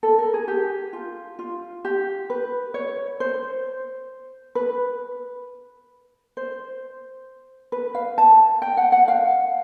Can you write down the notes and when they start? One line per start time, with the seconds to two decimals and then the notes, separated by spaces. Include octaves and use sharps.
0.03 A4
0.18 A#4
0.34 G#4
0.48 G4
0.93 F4
1.39 F4
1.85 G4
2.30 B4
2.74 C#5
3.20 C5
4.55 B4
6.37 C5
7.72 B4
7.95 F5
8.18 A5
8.62 G5
8.77 F#5
8.92 F#5
9.08 F5